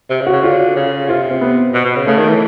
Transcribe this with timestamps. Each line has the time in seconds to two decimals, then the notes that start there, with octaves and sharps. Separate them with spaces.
0.10 C3
0.21 C#3
0.27 F#4
0.32 C#3
0.43 D3 F4
0.76 C#3
1.08 C3 F4
1.31 C4
1.41 B3
1.74 B2
1.85 B2
1.96 C#3
2.06 C#3 A3
2.18 D#3
2.29 E3